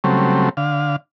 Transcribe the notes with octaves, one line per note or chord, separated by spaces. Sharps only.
C#3 F#3 G3 A3 C4
D3 F5